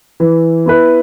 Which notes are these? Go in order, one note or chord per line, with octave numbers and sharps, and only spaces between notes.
E3
B3 E4 B4